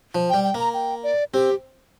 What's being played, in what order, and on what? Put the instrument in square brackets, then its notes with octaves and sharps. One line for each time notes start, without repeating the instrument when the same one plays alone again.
[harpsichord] F3
[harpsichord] G3 [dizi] G5
[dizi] G5
[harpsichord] A#3 [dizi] A#5
[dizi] G5
D5
[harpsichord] C4 [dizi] G4